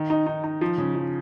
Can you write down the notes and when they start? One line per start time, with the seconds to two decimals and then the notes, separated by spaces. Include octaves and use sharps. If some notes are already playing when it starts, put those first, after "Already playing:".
Already playing: D#3
0.10 D#4
0.27 D#4
0.44 D#4
0.61 F3
0.78 C#3
0.95 F3